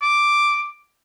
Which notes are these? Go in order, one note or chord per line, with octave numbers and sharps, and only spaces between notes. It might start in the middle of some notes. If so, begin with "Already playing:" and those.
D6